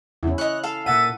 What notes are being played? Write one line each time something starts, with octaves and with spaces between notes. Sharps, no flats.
E2 C#4 E4
C#5 D#5 F#6
A4 F5
A#2 E5 F#5 A6 D#7